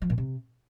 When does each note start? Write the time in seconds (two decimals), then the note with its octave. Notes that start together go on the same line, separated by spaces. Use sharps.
0.02 F3
0.10 A#2
0.18 C3